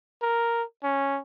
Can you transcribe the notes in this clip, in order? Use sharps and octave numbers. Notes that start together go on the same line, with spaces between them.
A#4
C#4